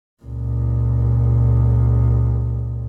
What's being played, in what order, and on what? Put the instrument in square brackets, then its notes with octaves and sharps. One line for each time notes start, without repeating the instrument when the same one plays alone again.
[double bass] C#2 A#2